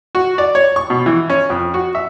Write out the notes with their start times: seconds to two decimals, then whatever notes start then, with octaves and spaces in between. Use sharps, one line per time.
0.15 F#4
0.38 D5
0.55 C#5
0.76 C#6
0.90 B2
1.06 E3
1.30 C#4
1.50 F2
1.74 F#4
1.95 E5